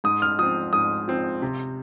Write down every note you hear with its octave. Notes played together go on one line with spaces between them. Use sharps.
G#2 D#6
F6
F3 C4 D#6
G#2 D#6
F3 C4
C3